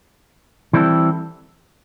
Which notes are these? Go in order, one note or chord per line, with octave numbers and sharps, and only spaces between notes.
E3 G3 C4 E4 A4